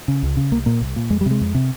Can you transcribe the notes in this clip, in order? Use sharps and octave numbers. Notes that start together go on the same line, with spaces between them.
C#3
C#2
C#3
C2 A#3
A#2 A#3
C2
A#2
F2 G#3
G3
C3 G#3
F2
C3